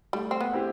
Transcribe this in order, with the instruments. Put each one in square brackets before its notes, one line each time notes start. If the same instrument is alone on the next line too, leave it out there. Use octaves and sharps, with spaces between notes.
[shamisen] G3 [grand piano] A3
[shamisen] C4
B3
[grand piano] C4 E4 G4